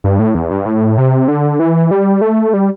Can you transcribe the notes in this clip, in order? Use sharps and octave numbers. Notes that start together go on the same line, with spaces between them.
G2
A2
E2
G2
A2
C3
D3
E3
G3
A3
G3